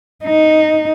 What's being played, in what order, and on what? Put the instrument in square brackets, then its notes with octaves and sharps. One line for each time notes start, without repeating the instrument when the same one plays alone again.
[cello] D#4